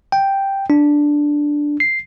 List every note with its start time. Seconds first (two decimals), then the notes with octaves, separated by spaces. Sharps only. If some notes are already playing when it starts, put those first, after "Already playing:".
0.12 G5
0.70 D4
1.80 C7